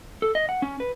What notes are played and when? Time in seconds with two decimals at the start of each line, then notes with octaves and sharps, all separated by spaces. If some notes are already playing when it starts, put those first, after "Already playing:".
0.22 A4
0.35 D#5
0.49 F#5
0.62 C#4
0.80 B4